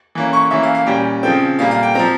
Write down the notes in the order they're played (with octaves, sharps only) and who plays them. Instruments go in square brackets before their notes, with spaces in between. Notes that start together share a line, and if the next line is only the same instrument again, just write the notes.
[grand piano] E3 A#3 C#4
C#6
E3 A#3 C#4 E5
F5
F5
A#2 G3 C#4 G5
C#3 F3 C4 G5
A#2 G3 A#3 F5
F5
G5
F3 C4 A#5